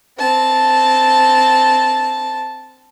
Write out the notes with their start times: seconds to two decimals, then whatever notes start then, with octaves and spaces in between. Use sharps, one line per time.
0.18 C4 A5